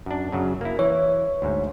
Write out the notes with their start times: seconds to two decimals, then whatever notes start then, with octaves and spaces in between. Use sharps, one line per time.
0.06 F#2 D4
0.32 F#2 C#3 F#3
0.61 A#3 E4
0.79 E3 C#5
1.42 D2 G#2